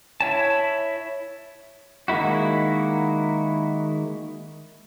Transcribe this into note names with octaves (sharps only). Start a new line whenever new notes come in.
E4 C#5 A5
D#3 G#3 A#3 E4 F#4